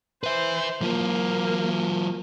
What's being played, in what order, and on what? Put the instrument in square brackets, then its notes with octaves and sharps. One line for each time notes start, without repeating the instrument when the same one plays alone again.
[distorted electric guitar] B4 E5 [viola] C5
[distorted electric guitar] F#3 F4 [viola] A#3